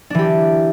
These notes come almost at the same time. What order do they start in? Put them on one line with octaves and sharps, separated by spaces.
D4 E3 G4